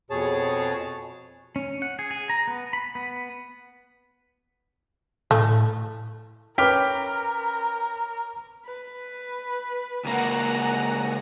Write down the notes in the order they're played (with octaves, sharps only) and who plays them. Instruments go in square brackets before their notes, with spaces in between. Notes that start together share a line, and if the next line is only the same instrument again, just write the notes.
[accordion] F2 B2 G#4 C#5 A5
[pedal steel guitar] C#4
F#5
G#4
G#4
A#5
B3
B5
B3
[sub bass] A2 [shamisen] A3
[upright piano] C#4 B4 [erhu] A#4 [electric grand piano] G5 [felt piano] D6 F6 B6
[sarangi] B4
[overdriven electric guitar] C#2 A#3 [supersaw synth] F#5 A#5